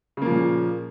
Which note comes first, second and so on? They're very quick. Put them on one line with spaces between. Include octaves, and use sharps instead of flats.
C#3 A#3 F3 A#2